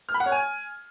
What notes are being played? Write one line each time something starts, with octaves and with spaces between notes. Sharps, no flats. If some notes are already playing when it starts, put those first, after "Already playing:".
F6
B5
F#5
C#5
G#5